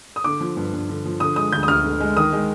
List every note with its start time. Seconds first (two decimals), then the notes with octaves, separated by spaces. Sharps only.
0.16 D#6
0.24 D3 D6
0.40 F3
0.57 G2
0.73 G2
0.89 D3
1.05 F3
1.20 D3 D#6
1.36 G#3 D#6
1.52 D2 G6
1.63 D#6
1.68 D2 F6
1.84 D3
2.00 G#3
2.17 D#3 D#6
2.32 G#3